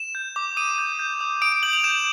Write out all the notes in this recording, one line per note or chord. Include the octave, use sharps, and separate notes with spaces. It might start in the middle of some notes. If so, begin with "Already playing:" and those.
Already playing: E7
G6
D6
D#6 D#7
G6
G6
D#6
D#6 D7
D7
G6 F#7
F7
G6 E7